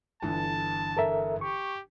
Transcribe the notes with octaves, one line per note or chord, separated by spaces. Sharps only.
G1 D3 E3 A5
A4 A#4 E5
G4 C#6